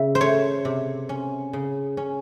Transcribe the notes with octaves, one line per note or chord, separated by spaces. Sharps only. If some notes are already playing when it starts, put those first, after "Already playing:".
Already playing: C#3 E5
C5
A3 C#5
C3
C#4
C#3
C#4